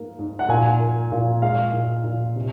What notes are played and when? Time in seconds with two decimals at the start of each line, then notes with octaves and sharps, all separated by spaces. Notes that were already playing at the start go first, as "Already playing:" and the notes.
Already playing: G#2 A#3
0.19 G#2
0.39 F#5
0.49 A#2 G#5
0.80 A#3
1.12 A#2
1.42 G#3 F5
1.73 A#2
2.04 A#2
2.36 C3